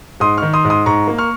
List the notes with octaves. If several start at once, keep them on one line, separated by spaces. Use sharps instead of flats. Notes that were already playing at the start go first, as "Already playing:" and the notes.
G#2 C6 D#6
D#3 C#6 F6
C6 D#6
G#2
C6 D#6
G#2 A#5 C#6
A#3
C#6 F6